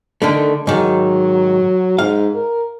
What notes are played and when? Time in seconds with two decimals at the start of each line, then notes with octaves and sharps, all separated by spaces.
0.22 D3 D#3 A3
0.67 G#2 D#3 F#3
1.99 G#2 F5
2.35 A#4